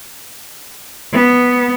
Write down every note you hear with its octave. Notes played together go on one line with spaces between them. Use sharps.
B3